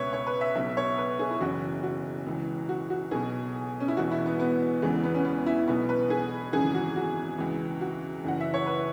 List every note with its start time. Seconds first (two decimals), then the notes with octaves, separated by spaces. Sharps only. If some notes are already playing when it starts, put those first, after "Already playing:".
Already playing: C#2 B2 B4 C#5 E5
0.13 C#5
0.27 B4
0.41 E5
0.55 B1 B2 E5
0.77 C#5
0.98 B4
1.19 G#4
1.31 E4
1.41 F#1 F#2 E3 F#4
1.83 F#4
2.26 C#2 C#3 E3
2.69 F#4
2.90 F#4
3.11 B1 B2 G#4
3.80 C#4
3.88 E4
3.97 E1 E2 B2 F#4
4.11 E4
4.26 B3
4.40 B3
4.82 E1 E2 C#3 E3 G#3
5.04 B3
5.15 C#4
5.25 B3
5.46 E4
5.67 B1 B2 B3
5.89 B4
6.10 G#4
6.53 G#1 F#2 C#3 E3 G#4
6.75 F#4
6.96 F#4
7.38 C#2 C#3 E3
7.81 F#4
8.24 F#1 F#2 E3 F#5
8.40 E5
8.54 C#5
8.66 B4